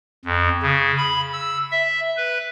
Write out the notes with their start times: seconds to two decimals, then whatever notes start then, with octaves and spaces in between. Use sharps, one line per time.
0.25 F2
0.62 C#3
0.97 B5
1.33 E6
1.71 E5
2.17 B4